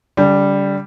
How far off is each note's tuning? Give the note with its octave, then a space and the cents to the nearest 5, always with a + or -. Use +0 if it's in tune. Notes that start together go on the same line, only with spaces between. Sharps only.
D3 -40 G3 +0